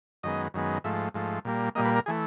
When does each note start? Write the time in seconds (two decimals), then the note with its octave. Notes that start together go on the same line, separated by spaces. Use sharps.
0.23 F#2 D#3 G#3 B3 D#5
0.54 F#2 D#3 G#3 B3
0.84 G#2 F3 A3 E5
1.14 G#2 F3 A3
1.45 A#2 G3 A#3
1.75 A#2 G3 A#3 D#5
1.85 B4
1.96 A#4
2.06 E3 A3 G#4